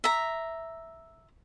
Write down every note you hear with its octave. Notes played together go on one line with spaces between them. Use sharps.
E5 A#5